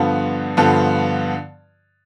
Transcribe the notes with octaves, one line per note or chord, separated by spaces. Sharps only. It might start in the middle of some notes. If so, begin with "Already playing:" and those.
Already playing: G2 D3 F3 B3 F4
G2 D3 F3 B3 F4